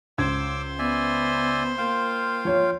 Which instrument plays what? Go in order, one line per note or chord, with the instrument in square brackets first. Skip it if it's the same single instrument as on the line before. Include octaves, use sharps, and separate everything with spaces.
[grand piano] C#2 G#6 [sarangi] C5 [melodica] D6 E6
[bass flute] B3 [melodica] D5 E5 G#5
[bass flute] A#3 [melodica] F4 F5 G5
[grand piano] F3 C#5